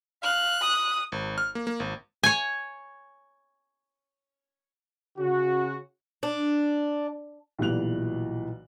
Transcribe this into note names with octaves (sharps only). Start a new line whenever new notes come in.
F5 F#6
D#6
G#1
F6
A#3
A#3
G#1
C#5 G#5
C#3 F#4
D4
B1 A#2 E3 G3 F#6 F7